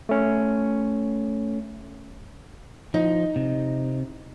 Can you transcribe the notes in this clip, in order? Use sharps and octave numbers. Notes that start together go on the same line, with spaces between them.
A3 C#4
F3 D#4
C3